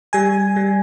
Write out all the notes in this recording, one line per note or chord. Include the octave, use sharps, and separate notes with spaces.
G3 G#5
G3